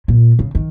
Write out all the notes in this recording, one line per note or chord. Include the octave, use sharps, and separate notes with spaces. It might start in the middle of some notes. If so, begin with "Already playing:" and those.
A#2
C#3
D#3